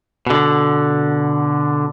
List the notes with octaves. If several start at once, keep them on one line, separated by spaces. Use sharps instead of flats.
B2 D3